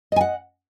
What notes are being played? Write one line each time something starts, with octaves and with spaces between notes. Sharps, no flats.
D#5 F#5 G#5